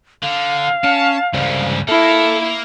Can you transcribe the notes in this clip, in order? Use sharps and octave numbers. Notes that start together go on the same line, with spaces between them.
D3 F5
C#4 A5
C#2 G2 C#3 C5 D5
A#3 E4 A4